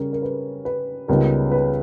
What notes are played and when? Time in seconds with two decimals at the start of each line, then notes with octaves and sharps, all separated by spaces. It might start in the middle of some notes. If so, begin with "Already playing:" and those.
Already playing: C#3 G3 C#4 A#4
0.13 A#4
0.22 B4
0.65 B4
1.08 C#2 C#3 G3 B3 D#4 A#4
1.51 B4